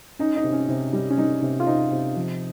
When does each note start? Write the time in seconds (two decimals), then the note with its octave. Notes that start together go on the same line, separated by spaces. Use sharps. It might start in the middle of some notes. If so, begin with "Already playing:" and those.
0.19 C#4 D#4
0.36 D#4
0.44 C3
0.52 C#4
0.69 C3
0.93 G3
1.10 C#4
1.17 G3 D#4
1.42 C3
1.60 F4
1.67 C3 D#4
1.91 C3
2.16 F3